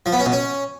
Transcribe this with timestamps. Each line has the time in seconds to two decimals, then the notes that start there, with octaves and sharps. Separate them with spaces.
0.06 F3
0.12 B3
0.19 C#4
0.26 B2
0.32 C#4